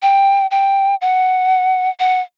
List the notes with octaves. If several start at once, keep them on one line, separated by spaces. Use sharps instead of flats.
G5
G5
F#5
F#5